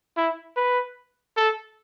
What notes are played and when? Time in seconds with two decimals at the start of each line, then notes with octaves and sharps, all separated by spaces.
0.17 E4
0.57 B4
1.37 A4